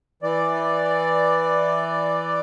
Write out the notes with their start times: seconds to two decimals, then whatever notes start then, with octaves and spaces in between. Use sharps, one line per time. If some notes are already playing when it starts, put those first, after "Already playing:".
0.23 E3 D5